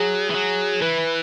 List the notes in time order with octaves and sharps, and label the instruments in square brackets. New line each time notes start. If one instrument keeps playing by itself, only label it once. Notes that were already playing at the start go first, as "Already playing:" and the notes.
Already playing: [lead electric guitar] F#3 [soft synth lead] G#4
[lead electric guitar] E3
F#3
[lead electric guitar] E3 [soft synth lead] B4